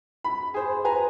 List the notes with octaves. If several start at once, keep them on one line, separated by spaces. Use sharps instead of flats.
B5
G#4 C5
B4 C5 G#5 A#5